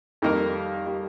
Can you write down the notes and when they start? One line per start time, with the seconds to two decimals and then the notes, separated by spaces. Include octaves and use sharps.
0.22 F2 D#3 G3 A#3 D#4 A#4
0.86 G3